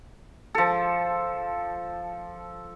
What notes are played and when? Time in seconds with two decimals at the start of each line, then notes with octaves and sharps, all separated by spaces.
0.55 F3 A4